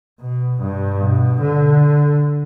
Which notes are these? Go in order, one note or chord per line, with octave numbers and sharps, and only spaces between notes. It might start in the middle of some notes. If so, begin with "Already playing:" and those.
B2
G2
B2
D3